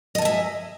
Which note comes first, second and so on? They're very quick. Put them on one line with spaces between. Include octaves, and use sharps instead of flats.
D#5 A5 G#5 E5